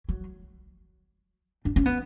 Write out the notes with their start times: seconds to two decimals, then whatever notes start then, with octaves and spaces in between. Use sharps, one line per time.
0.09 F#3
1.65 D4
1.76 C#4
1.86 B3